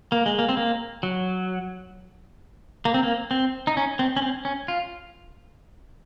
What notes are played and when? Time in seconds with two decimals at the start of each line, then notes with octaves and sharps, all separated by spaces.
0.12 A#3
0.26 G#3
0.39 A#3
0.49 C4
0.57 A#3
1.03 F#3
2.85 A#3
2.94 C4
3.03 A#3
3.31 C4
3.67 D#4
3.77 C#4
3.99 C4
4.16 C#4
4.22 C4
4.45 C#4
4.68 F4